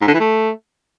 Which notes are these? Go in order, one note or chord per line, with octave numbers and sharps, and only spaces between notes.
G#2
D3
E3
A3